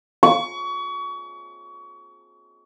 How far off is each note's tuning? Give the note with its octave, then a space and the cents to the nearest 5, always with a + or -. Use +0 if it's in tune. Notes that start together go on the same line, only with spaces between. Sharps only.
C#6 +30